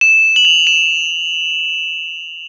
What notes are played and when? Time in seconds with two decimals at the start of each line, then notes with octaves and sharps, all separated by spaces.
0.01 E7
0.36 F#7
0.45 F7
0.67 E7